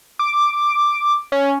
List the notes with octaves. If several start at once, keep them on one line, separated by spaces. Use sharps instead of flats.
D6
C#4